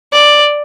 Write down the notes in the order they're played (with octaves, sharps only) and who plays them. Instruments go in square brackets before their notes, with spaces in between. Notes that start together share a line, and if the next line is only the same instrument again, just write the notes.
[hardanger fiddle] D5